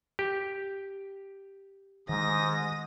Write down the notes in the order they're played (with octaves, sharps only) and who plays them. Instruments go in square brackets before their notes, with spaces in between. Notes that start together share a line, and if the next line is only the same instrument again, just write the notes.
[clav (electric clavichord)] G4
[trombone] G#2 [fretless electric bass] D#3 G#3 [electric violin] D#6 A#6